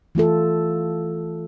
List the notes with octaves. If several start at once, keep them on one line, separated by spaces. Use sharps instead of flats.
E3 A3 F4 A4